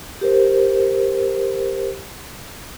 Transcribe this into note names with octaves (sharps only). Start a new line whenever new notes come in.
G4 A#4 C5